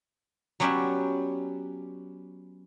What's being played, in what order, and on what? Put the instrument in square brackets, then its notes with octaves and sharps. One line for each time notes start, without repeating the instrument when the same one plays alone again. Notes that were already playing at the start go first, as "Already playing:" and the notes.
[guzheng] F#3 B3 C#4 G4 D5 E5